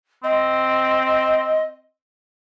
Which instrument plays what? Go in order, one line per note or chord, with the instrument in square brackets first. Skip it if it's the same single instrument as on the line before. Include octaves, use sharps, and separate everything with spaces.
[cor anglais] C4 [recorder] D#5